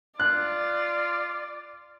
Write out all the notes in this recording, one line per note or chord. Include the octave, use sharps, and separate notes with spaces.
F4 D5 F#6